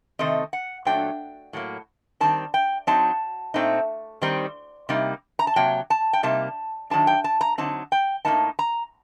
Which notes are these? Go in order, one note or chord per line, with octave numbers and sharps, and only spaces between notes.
C3 D#3 A3 C4 D#5
F#5
A#2 F#3 A3 D4 G5
A2 F#3 A#3
D#3 G3 C4 A5
G5
F#3 C4 D#4 A5
A#2 A3 C4 D#4
D#3 G3 C4 D#4
C3 G3 A#3 D#4
A#5
A5
C3 F#3 A#3 G5
A5
G5
C3 G3 A#3 D#4 A5
D#3 F#3 A3 D4 A5
G5
A5
A#5
D3 F#3 C4 D#4 A5
G5
A2 G3 A#3 D#4 A5
A#5